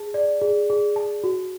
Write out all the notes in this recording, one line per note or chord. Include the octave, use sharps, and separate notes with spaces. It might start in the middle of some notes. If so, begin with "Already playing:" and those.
Already playing: G#4 A5
D5
G#4
G#4
A5
F#4